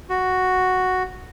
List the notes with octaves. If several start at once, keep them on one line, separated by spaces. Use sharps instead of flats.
F#4